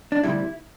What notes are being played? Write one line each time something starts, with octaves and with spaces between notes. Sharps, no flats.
D4
D2 C3 G3 E4